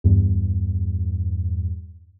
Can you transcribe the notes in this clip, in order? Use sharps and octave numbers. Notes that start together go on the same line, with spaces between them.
E2 G2